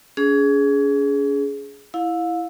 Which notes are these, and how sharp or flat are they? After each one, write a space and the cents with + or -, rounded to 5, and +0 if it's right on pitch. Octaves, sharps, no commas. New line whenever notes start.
C#4 +45 G#4 +10
E4 +0 F5 +30